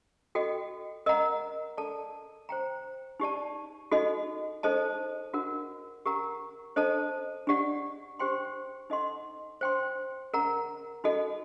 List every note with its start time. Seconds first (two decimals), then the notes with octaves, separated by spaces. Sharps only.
0.35 F#4 A4 D#5 G5
1.06 A#4 D#5 F#5 A#5
1.77 A4 D5 A5
2.49 C5 G5 A#5
3.20 D#4 G4 D5 A5
3.91 D#4 F#4 A4 D#5
4.63 D#4 A4 C5 D#5 A5
5.33 D4 F#4 A#4 F#5
6.06 G4 A#4 F#5 A#5
6.76 D4 A4 C5 D#5 A5
7.47 D4 G4 D5 F#5
8.19 G4 C5 G5 C6
8.90 D#4 A4 D#5 F#5 C6
9.61 C5 G5 C6
10.34 A#4 F#5 A#5
11.04 D#4 F#4 A4 D#5